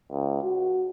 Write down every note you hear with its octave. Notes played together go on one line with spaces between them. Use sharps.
C#2
F#4